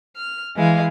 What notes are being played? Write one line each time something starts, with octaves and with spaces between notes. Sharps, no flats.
F6
E3 G#3 F5